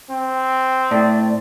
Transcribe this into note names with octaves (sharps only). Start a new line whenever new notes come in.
C4
A2 D5